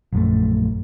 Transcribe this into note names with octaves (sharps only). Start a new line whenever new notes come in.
A#1 F#2 A3